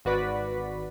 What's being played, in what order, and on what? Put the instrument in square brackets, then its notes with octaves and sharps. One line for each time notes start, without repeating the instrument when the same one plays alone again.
[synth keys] G#1 F#4 B4 D5 B6